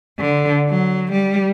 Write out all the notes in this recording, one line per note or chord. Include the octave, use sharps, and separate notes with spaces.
D3
F#3
G3